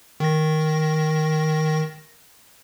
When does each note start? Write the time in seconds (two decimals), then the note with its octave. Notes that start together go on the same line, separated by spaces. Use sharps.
0.20 D#3 A#6